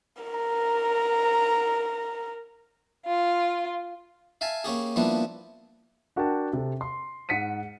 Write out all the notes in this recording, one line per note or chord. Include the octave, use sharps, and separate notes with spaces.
A#4 A#5
F4
E5 F5 G#5 A5
A#3 C#4 G4 G#4
F3 G3 A#3 B3 D4 E4
D4 F#4 A#4 F#5 G5 A5
C3 A4
C6
G#2 F#5 B6 C#7 D#7